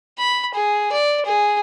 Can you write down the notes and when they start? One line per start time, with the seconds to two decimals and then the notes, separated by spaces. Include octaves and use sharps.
0.18 B5
0.55 G#4
0.92 D5
1.26 G#4